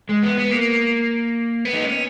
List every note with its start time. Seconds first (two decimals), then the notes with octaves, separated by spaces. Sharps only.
0.09 G#3
0.23 B3
0.37 B3
0.51 A#3
1.65 B3
1.73 D#4
1.84 C#4